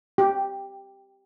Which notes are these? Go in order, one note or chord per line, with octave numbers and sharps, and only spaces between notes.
G4